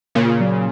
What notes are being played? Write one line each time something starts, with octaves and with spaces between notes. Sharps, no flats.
A#2 C#3 A#3
F#3